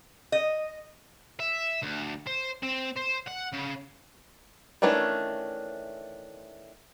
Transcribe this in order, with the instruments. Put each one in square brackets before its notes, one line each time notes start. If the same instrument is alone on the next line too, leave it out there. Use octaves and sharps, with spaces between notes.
[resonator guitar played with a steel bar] D#5
[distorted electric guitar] E5
D2
C5
C4
C5
F#5
C#3
[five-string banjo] D#3 E3 A3 C#4 D4